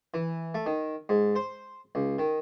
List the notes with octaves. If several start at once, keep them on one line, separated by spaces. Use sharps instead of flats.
E3
A3
D#3
G#2
C5
C#2
D#3